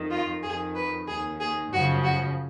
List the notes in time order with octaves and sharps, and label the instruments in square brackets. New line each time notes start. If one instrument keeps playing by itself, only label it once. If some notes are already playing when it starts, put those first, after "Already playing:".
Already playing: [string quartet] F2 D#3
F4
F2 D#3 G#4
B4
D#2 D#3 G#4
G#4
F#2 C#3 F3 F#4
F#4